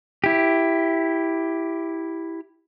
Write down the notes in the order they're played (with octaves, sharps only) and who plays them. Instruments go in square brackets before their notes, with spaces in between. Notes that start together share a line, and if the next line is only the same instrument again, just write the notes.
[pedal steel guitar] E4 G4